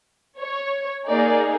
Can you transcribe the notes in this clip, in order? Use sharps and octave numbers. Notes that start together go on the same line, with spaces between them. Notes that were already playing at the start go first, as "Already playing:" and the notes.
C#5
A#3 D#4 G#4 D5